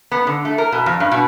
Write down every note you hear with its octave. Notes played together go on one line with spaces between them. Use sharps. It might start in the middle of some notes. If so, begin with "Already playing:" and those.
B3
D3
A3
A#4
B2
F2
G2
B2